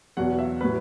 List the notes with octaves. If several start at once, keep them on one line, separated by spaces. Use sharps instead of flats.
E2 B2 F#3 F#5
E5
A2 F#3 B4